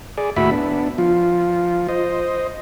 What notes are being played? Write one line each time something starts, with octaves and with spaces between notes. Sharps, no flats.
G#4 D5
D#2 A2 E4 F#4 E5 B5
B3 D4
F3 F4
C5 D#5